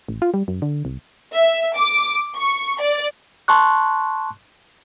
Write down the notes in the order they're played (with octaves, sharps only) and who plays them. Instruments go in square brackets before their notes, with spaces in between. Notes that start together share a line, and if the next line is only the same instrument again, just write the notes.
[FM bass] A1
F4
G3
F#2
D3
C2
[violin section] E5
D6
C#6
D5
[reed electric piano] A5 C6 C#6 F#6